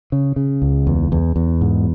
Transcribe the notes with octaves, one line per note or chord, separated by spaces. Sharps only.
C#3
C#3
C#2
E2
E2
E2
G#2